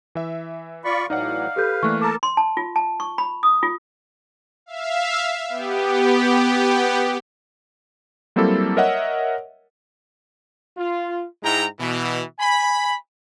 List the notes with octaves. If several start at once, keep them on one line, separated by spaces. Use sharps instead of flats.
E3 E5
F4 D5 B5 C#6
A2 E3 F#3 D#4 D5 F5 F#5
G4 A4 B4 G6
E3 G3 A3 A#3 C#6 F#6
A4 A#4 A5 A#5 D6
C6
A5
F4
A5
C#6
B5
D#6
F4
E5 F5
B3 G4
F#3 G3 A#3 C4 E4 A4
A#4 C#5 D#5 E5 F#5
F4
G#2 G#3 E4 G5 A#5
B2 E3
G#5 B5